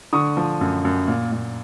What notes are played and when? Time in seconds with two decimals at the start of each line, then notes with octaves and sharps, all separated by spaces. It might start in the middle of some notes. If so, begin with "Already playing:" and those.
0.13 D3 C#6 D#6
0.37 F3
0.61 F#2
0.85 F#2
1.08 A#2
1.32 A#2